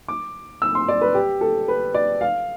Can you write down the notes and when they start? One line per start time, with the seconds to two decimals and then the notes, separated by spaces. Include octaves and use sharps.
0.08 D6
0.62 E6
0.75 C6
0.88 D5
1.01 B4
1.15 G4
1.41 A4
1.68 B4
1.94 D5
2.21 F5